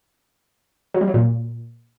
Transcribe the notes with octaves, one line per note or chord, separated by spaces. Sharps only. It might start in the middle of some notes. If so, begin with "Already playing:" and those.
F#3
G3
F#3
A#2